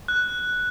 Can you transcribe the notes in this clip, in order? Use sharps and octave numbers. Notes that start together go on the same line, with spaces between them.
F#6